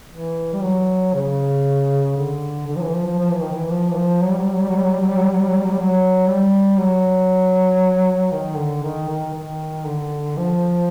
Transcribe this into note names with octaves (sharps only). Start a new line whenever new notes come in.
E3
G3
F#3
C#3
D3
D3
F3
E3
F3
F3
F3
E3
D#3
E3
F3
E3
F3
F#3
G3
F#3
G3
F#3
G3
F#3
G3
F#3
G3
F#3
G3
F#3
G3
F#3
G3
F#3
G3
F#3
G3
F#3
G3
F#3
D#3
D3
D#3
D#3
D#3
D3
F3